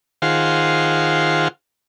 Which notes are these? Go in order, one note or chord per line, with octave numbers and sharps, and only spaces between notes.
D#3 F4 G#4 C5 F5 F#5